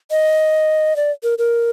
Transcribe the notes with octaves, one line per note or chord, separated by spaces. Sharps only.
D#5
D5
A#4
A#4